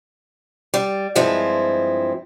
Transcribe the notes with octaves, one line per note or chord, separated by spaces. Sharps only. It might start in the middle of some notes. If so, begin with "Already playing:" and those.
G3
G2 F3 G#3 C4 E4